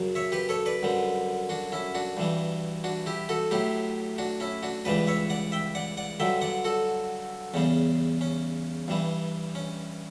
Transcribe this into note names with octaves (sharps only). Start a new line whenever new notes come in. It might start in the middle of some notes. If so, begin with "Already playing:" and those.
Already playing: F#2 C#3 F#3
C#5 E5
G4 B4
A4 C#5
B4 D5
F#2 D3 G3
D4 F#4
C#4 E4
D4 F#4
G2 E3 G3
D4 F#4
E4 G4
F#4 A4
A2 F#3 E4 G4
D4 F#4
C#4 E4
D4 F#4
C#2 C#3 E3 G3 B4 D5
C#5 E5
D5 F#5
E5 G5
D5 F#5
D5 F#5
G2 D3 F#3 E5 G5
D5 F#5
F#4 A4
E2 C#3 G3 C#4
C#4
G2 E3 G3
C#4